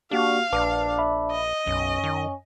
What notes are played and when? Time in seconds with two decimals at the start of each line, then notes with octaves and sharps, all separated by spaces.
0.11 A#3 D4 F#4 G4 F5
0.53 A#1 D4 B4 A5 D6
0.99 E5 B5
1.31 D#5
1.66 B1 F#2 C#4
2.04 D#3